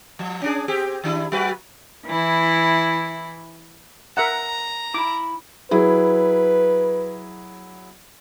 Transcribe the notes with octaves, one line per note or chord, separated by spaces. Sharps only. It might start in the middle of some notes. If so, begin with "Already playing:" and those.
F3
C#4 D4 G#4
C4 G4 G#4
D#3 D4 E4
F#3 F#4 B4
E3 E4
A#4 E5 F#5 A#5
E4 B5 D6
F#3 E4 G#4 B4